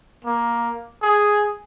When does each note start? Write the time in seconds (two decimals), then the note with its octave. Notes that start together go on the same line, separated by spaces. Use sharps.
0.24 A#3
1.02 G#4